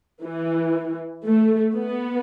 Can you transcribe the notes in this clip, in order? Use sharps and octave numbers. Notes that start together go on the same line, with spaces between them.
E3
A3
B3